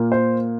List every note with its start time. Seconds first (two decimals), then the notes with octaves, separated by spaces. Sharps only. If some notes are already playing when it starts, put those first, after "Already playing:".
Already playing: A#2 A#3
0.12 C5